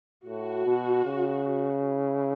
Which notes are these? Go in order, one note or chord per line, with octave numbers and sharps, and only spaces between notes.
A2 F#4
B2
C#3
E4